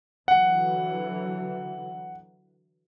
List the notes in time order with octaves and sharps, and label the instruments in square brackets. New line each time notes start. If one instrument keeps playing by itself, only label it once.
[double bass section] D3 E3 F#3 [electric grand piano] F#5